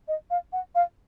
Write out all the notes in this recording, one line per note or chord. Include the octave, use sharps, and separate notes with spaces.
D#5
F5
F#5
F5